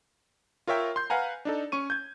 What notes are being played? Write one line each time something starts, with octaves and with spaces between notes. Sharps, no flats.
F4 A#4 C#5 E5 G5
C6 G6
B4 F5 F#5 G#5 A#5
D4 D#4 A4
C#4 C#6 D#7
G6 G#6